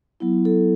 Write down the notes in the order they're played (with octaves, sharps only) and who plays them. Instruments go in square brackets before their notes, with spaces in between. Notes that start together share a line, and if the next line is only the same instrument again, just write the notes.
[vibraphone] F#3 B3 E4
A4